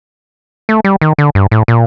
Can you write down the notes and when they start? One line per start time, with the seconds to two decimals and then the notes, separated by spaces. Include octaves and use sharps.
0.69 A3
0.85 G3
1.01 D#3
1.18 D3
1.35 G2
1.51 A2
1.68 A#2